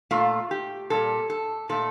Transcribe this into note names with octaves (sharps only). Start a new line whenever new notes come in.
A#2 A3 F4
G4
A#2 G3 A4
A4
A#2 A3 A4